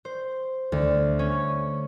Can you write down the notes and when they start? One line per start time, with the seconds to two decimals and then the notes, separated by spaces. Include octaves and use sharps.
0.05 C5
0.72 D2
1.19 C#4